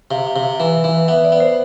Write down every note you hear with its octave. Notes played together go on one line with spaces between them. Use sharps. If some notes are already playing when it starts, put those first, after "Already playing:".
C3 F5
F5
C3
F5
E3
E3
B3 E5
D5
B3
C5